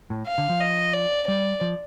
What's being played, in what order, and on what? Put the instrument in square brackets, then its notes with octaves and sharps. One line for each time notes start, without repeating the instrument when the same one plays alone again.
[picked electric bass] A2
[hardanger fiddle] F5
[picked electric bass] D3
F3
[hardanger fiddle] D#5
D5
[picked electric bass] G3 [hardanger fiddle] D5
[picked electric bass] F3